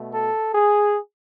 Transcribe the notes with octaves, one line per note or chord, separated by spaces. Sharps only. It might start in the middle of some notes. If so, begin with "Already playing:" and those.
Already playing: B2 A3
A4
G#4